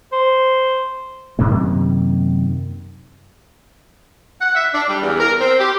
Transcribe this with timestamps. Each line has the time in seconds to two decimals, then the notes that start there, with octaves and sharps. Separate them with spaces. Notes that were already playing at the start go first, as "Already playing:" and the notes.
0.13 C5
1.39 F#2 C3 D#3 A#3
4.41 F#5
4.55 E5
4.74 D4
4.89 G3
5.02 E2
5.20 A#4
5.41 C4
5.60 G4